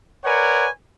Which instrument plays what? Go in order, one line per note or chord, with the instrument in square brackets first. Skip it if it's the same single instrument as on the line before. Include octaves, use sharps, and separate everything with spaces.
[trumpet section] A#4 B4 C#5 D5 F#5 G#5